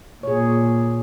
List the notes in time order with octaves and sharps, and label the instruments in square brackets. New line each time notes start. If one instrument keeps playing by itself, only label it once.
[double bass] A#2 [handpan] G#4 C#5